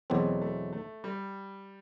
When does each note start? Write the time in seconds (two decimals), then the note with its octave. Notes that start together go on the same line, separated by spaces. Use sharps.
0.10 E2 B2 F#3 A3 C4
0.41 A3
0.73 A3
1.04 G3